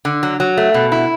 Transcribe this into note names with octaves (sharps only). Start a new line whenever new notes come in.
D3
F#3
F#3
A3
B2
E4